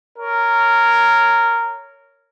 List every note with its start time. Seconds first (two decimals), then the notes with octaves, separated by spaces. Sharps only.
0.19 A#4 C#5